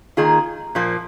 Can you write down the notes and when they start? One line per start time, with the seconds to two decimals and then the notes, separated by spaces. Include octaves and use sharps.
0.17 D#3 A#3 F4 G#4
0.75 A#2 F3 A#3